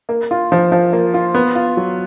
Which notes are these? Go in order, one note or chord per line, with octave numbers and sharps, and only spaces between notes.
A#3
F4
F3
F3
A#3
F4
B3
F4
F#3